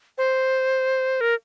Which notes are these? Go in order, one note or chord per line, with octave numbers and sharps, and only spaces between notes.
C5
A#4